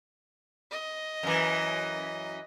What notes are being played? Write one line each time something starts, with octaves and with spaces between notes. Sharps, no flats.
D#5
F#2 E3